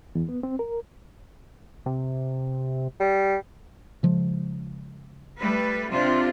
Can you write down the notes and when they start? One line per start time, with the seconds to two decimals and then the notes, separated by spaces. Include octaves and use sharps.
0.15 E2
0.29 B3
0.43 C4
0.59 A#4
1.86 C3
3.00 G3
4.03 C#3 F3 G#3
5.41 G3 A3 B4
5.91 C3 D4 F4